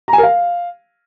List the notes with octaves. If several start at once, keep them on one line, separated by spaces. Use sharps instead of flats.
A#5
G#5
A#4
F5